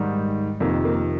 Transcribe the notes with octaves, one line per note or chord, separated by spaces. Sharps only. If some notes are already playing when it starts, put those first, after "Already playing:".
Already playing: G#2 D#3 G3
F2 C3 D#3 A#3
A#3